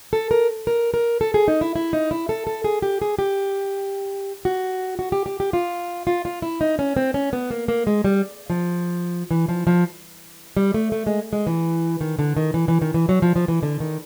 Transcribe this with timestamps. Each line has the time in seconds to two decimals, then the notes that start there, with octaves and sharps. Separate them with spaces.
0.13 A4
0.31 A#4
0.67 A#4
0.94 A#4
1.21 A4
1.34 G#4
1.48 D#4
1.61 E4
1.76 E4
1.93 D#4
2.11 E4
2.29 A4
2.47 A4
2.64 G#4
2.82 G4
3.02 G#4
3.19 G4
4.45 F#4
4.99 F#4
5.12 G4
5.26 G4
5.40 G4
5.53 F4
6.07 F4
6.25 F4
6.42 E4
6.61 D#4
6.79 C#4
6.96 C4
7.14 C#4
7.33 B3
7.51 A#3
7.68 A#3
7.87 G#3
8.04 G3
8.50 F3
9.31 E3
9.49 F3
9.67 F3
10.57 G3
10.74 A3
10.92 A3
11.07 G#3
11.33 G#3
11.47 E3
12.01 D#3
12.19 D3
12.37 D#3
12.54 E3
12.68 E3
12.82 D#3
12.94 E3
13.09 F#3
13.22 F3
13.36 F3
13.48 E3
13.63 D3
13.80 D#3